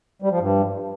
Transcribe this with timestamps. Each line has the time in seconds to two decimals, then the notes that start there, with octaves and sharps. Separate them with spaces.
0.22 G3
0.31 F3
0.40 G2